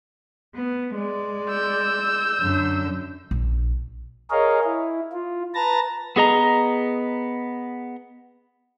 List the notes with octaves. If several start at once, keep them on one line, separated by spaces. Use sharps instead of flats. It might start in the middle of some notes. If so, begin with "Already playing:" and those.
B3
G#3 D5
E6 G6
F#2 D3
A#1
G#4 A#4 C#5 D#5 F5
E4
F4
B4 A5 A#5 A6 A#6
B3 G#4 D#5 A#5